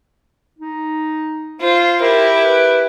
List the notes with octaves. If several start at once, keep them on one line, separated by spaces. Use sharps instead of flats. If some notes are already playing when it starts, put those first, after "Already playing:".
D#4
F4 C5
E4 G4 A#4
B4